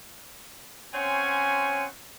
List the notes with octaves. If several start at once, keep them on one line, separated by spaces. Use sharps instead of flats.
C4 C#4 C5 C#5 F#5 G#5